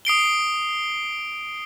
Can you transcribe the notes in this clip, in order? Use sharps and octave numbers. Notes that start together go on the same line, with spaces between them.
D#6 C7 D7 G7